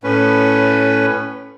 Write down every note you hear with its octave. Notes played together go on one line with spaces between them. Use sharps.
A2 A3 C#4 B4